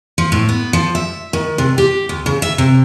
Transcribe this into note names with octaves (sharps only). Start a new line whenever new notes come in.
F3
A2
B3
F3
E5
D#3
C3
G4
D2
C#3
E5
C3